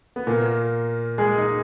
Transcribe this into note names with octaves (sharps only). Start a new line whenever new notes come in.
B3
A#2 A#3
G#3 G#4
D#4